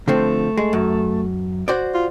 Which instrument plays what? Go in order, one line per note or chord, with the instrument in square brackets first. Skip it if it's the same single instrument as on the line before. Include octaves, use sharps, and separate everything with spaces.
[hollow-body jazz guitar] D3 F3 C4 [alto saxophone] A3
[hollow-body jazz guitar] G#3
F#2
F#4 C5 D5
[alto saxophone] F4